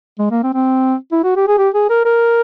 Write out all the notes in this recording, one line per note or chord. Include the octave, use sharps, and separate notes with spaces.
G#3
A#3
C4
C4
E4
F#4
G4
G#4
G4
G#4
A#4
A#4